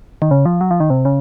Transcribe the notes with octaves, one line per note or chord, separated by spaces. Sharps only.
D#3
C#3
F3
F#3
F3
D#3
C3
C#3